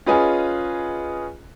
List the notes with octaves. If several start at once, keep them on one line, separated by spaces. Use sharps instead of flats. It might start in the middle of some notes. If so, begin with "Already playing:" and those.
C#4 F4 G#4 B4 D#5 G#5